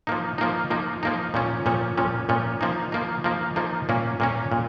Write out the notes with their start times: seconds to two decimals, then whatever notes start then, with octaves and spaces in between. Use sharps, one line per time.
0.07 F3 A#3 D#4
0.38 F3 A#3 D#4
0.70 F3 A#3 D#4
1.03 F3 A#3 D#4
1.34 A#2 F3 C#4
1.66 A#2 F3 C#4
1.98 A#2 F3 C#4
2.29 A#2 F3 C#4
2.61 F3 A#3 D#4
2.92 F3 A#3 D#4
3.24 F3 A#3 D#4
3.56 F3 A#3 D#4
3.89 A#2 A#3 C#4
4.20 A#2 A#3 C#4
4.52 A#2